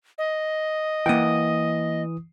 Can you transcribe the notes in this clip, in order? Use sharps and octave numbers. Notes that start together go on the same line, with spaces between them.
D#5
E3 A#3 F#5 G5 D#6